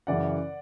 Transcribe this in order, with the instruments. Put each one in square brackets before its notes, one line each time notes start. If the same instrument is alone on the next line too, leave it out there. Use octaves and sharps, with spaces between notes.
[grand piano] F#2 C#3 E3 [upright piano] D5 F#5